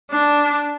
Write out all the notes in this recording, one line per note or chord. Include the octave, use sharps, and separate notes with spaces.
D4